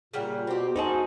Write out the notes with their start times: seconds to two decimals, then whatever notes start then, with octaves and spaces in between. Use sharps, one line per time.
0.13 A#2 C#3 G3 F#5
0.47 B2 C4 G4
0.76 F3 D#4 F#4 G#4 A4 C5 A5